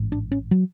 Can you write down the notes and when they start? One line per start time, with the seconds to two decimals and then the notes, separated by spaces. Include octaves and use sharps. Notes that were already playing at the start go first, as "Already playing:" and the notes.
Already playing: A1 G#2
0.12 D4
0.32 C#4
0.51 F#3